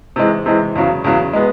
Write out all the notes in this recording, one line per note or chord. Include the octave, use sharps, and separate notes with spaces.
C3 E3 G#3
C3 E3 G#3
E2 C#3 F#3
E2 C#3 F#3
G#3 B3